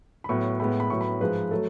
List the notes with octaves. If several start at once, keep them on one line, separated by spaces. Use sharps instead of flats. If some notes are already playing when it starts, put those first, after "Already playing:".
B5
A2 F#3 B3 C#6
A2 G#3 B3 B5
B5
A2 F#3 B3 C#6
B5
G#2 F3 G#3 B4
F#3 A3 A4